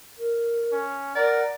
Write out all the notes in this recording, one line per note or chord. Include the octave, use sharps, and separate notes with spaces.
A#4
C#4
A#4 D5 F#5